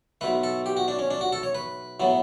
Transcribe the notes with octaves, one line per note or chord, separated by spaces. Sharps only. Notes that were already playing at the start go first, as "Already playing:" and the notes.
B1 B2 A3 B4
A4
G4
F#4
D4
C#4
D4
F#4
A4
C#5
B4
A2 F#3 B3